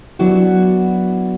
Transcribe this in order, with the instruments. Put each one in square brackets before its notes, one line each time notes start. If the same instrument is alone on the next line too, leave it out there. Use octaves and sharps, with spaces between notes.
[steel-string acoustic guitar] F#3 B3 D4 E4 F#4